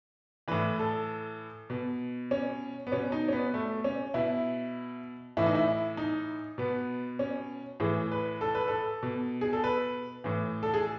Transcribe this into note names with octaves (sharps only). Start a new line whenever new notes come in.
A2 E3 B4
A4
B2
C#4
B3
B2 C#4
D#4
C#4
B3
A3
C#4
B2 E4
A2 E3 E4
D#4
E4
D#4
B2 B3
C#4
A2 E3 G#4
B4
A4
B4
A4
B2
G#4
A4
B4
A2 E3
A4
G#4